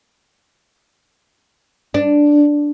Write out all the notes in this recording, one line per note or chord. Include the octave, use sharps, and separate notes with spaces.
D4